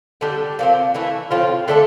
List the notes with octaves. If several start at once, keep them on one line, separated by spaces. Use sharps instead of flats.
D3 G3 D4 G4
A#2 F3 C4
E3 A3 E4
A2 F3 C4 F4
D3 A3 D4 A4